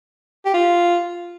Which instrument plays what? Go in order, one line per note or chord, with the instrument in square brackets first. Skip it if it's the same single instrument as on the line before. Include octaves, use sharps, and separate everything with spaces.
[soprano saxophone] G4
F4